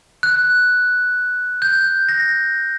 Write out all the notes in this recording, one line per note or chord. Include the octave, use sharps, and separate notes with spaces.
F#6
G6
A#6